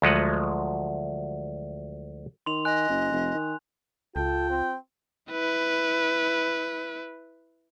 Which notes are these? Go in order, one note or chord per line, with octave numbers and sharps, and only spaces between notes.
D2 F3 F#3 G#3 D#5 F#5
D#3 C6 F7
D#5 G#5 F#6
F#1
F1
D#3
C#2 F4 A4 G5
C4
E4 B4